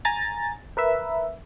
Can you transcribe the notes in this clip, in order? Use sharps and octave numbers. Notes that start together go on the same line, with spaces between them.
G#5 A#5 A6
A#4 B4 E5